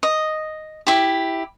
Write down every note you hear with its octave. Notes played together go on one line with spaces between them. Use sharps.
D#5
E4 G4